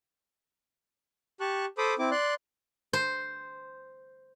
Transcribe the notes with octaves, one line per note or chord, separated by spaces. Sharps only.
G4 A5 C#6 F#6
A4 C5 B5 D6 D#6
C4 E4 D6
D5 C6 F#6
C5